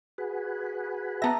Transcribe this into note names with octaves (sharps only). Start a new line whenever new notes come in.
F#4 G#4 B4
B3 E5 A5 A#5 A#6